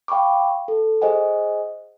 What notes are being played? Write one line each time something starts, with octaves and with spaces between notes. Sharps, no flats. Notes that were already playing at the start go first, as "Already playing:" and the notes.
F5 G5 B5 C#6 D6
A4
G#4 C5 D#5 F#5 G#5